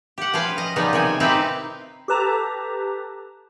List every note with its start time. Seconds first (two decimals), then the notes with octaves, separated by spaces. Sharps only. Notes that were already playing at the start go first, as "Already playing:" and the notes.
0.18 G4 F#5
0.34 F3 C#4 B4 F5
0.58 D#5
0.76 C#3 F3 G3 B3 D#4
0.93 C3 D#3 G5 G#5
1.20 C4 D#4 E4 G4 B4 F5
2.08 G4 A4 B4 A5 A#5